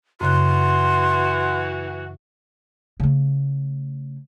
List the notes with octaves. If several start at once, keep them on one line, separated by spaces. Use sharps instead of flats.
F#2 C#3 E3 F#4 C6 F#6
C#3 A3